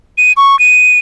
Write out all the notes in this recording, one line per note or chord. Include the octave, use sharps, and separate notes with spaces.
D#7
C#6
D#7